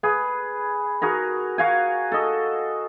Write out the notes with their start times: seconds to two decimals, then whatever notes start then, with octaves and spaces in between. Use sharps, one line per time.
0.03 G#4 B4
1.02 F#4 G#4 A#4
1.58 F#4 F5 G#5
2.12 A4 D#5